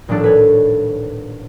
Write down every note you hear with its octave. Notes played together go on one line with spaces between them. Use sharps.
D#1 A#1 A2 D4 A4
B4 C#5